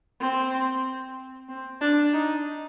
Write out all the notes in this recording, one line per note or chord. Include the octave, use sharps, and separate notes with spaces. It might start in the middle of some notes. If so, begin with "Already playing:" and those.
C4
C4
D4
D#4